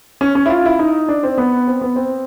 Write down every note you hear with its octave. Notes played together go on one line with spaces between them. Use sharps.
C#4
C#4
E4
F4
E4
D#4
D4
C4
B3
C4
B3
C4